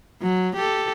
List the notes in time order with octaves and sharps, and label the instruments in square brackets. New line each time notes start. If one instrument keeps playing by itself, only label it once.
[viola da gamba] F#3
G4 A4